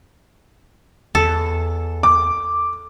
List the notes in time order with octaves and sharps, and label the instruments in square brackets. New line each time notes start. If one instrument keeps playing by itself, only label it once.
[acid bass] E2 [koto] A4
[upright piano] D6